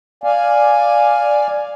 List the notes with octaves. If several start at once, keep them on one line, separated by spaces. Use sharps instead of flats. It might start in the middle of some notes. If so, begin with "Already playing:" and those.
D5 F5 G#5